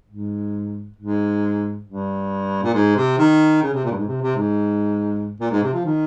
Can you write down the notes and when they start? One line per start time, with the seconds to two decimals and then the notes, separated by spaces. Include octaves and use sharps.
0.08 G#2
0.97 G#2
1.85 G2
2.63 A#2
2.74 G#2
2.96 C3
3.18 D#3
3.62 C#3
3.74 C3
3.85 A#2
3.91 G2
3.96 G#2
4.07 C3
4.22 C3
4.36 G#2
5.40 A#2
5.51 G#2
5.63 C3
5.74 F3
5.85 D#3